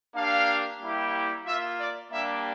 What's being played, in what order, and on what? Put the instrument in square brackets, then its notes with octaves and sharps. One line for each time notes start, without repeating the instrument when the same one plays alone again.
[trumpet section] A#3 D4 G4 F5
G3 A#3 E4 G4
A#3 F4 E5
D5
G3 A#3 D4 G4 E5